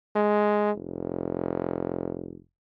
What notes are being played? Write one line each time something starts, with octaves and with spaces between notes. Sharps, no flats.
G#3
F1